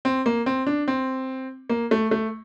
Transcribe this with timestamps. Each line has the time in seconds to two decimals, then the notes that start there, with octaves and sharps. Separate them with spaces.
0.05 C4
0.26 A#3
0.46 C4
0.67 D4
0.88 C4
1.70 A#3
1.91 A3
2.11 A3